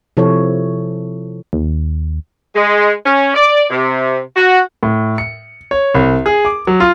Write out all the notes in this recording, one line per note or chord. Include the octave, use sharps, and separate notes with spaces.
C3 F3 E4 A4 C#5
D#2
G#3
C#4
D5
C3
F#4
A2
C#7
C#5
C2
G#4
D6
F#3
F4